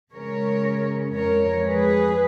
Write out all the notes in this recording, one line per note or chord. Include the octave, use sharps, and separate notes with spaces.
C#3 G#3 C#4 A#4 C#5
F2 F3 G#3 A#4 C#5
G#4 B4